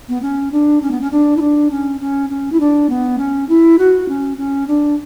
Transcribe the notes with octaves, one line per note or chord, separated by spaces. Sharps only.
B3
C#4
D4
C#4
B3
C#4
D4
E4
D4
C#4
C#4
C#4
E4
D4
B3
C#4
E4
F#4
C#4
C#4
D4